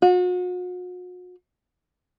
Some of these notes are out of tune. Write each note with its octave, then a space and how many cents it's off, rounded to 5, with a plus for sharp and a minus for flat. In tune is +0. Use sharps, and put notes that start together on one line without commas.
F#4 -40